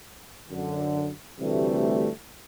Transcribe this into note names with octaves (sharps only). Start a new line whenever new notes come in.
F#2 D3
D2 C3 E3 G3 A3